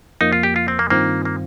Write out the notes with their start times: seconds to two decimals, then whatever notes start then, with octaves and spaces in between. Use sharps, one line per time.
0.20 F2 F3 A#3 D#4
0.33 F4
0.43 G4
0.56 F4
0.68 C4
0.79 A#3
0.90 G2 D#3 A#3 C4 F4
1.25 A#3